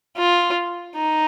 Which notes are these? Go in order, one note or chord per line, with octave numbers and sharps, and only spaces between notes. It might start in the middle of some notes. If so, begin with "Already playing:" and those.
F4
D#4